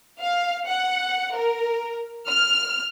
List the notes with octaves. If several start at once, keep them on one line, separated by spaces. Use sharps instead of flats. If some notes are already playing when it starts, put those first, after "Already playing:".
F5
F#5
A#4
F6